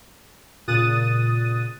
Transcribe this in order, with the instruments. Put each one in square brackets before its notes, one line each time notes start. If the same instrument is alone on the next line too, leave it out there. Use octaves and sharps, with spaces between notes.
[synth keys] A#2 C#3 D#6 F#6 A6 D#7